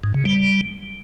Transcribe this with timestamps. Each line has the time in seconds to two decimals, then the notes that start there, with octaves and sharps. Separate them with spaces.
0.04 G#2
0.14 C#3
0.25 G3